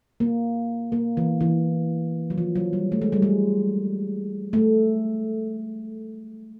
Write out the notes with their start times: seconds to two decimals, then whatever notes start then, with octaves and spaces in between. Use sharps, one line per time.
0.20 A#3
0.92 A#3
1.17 E3
1.41 E3
2.30 F#3
2.38 F3
2.56 F#3
2.73 G3
2.92 A3
3.02 G#3
3.12 G3
3.22 G#3
4.53 A3